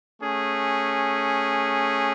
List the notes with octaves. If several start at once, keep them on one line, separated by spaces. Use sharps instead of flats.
A3 C#4 G#4